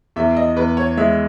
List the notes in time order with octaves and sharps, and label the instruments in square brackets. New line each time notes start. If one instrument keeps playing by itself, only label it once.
[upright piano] E2 [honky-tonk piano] E5
[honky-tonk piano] D#5
[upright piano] E2 [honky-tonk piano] B4
[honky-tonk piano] C#5
[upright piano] G#3 [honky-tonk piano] E5